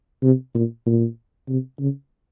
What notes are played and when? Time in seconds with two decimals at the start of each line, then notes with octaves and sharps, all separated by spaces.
0.23 C3
0.55 A#2
0.86 A#2
1.49 C3
1.80 C#3